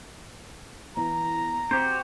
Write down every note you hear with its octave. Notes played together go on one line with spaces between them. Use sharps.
E3 B3 E4 A#5
C4 F#4 G4 C5